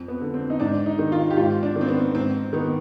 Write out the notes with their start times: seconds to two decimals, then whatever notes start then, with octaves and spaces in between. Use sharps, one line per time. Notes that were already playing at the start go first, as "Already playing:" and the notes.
Already playing: F2
0.08 B3
0.21 D3
0.34 C4
0.50 D#4
0.60 G#2 D4
0.86 D#4
0.99 D#3
1.12 F4
1.30 G4
1.37 G#2 F4
1.63 D4
1.76 D#3
1.81 C4
1.88 B3
2.15 G#2 C4
2.53 D#3 B3